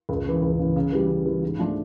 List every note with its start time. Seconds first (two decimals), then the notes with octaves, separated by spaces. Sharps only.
0.09 C#2
0.25 C#3 E3
0.42 C#2
0.59 C#3 E3
0.76 C#3
0.92 E3 G3
1.09 C#3
1.25 E3 G3
1.42 G#2
1.59 F3 A3 D4 F4